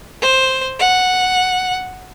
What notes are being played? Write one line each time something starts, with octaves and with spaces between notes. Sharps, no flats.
C5
F#5